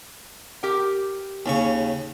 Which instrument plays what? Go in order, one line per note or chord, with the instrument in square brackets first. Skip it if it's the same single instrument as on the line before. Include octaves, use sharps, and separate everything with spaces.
[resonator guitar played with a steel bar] G4 A#4 G5
[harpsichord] D#2 C#3 C#6